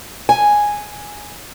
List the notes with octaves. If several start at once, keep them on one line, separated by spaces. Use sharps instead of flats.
G#5